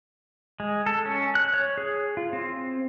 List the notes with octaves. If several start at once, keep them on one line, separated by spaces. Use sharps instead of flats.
G#3
A4
C#4
F#6
C#5
G#4
F4
C4